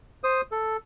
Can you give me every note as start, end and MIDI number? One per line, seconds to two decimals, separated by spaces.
0.24 0.41 72
0.24 0.41 87
0.51 0.77 69